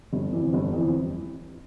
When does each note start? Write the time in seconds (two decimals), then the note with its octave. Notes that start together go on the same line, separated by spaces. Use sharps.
0.13 G1
0.33 F2 E3
0.53 G1
0.73 F2 E3